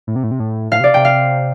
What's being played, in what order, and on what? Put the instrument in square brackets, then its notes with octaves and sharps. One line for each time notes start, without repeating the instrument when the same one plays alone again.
[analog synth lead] A2
C3
A2
C3
A2
[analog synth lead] A2 [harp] F5
[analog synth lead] C3 [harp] D5
[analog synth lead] C3 [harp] G5
[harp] F5